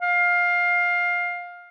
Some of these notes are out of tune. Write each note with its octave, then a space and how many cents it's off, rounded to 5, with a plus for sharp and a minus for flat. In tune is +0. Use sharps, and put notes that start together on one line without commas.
F5 +15